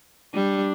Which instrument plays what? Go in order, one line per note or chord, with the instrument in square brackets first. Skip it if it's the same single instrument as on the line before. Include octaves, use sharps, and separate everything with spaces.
[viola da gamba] G3 [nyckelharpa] D4